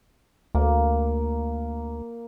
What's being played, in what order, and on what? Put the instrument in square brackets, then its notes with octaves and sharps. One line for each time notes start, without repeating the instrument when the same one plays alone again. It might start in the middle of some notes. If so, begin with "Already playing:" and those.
[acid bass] D2 [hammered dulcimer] A#3